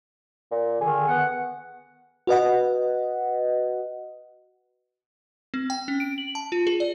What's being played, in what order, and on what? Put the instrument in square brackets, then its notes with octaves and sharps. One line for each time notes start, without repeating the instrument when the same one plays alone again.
[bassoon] A#2
[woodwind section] D3 D#3 [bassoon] G#4
[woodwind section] B3 F#5
[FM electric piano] F#4 B4 D#5 F#5
[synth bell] C4
G5
C#4
D7
F#7
A5
F4
G#4
D5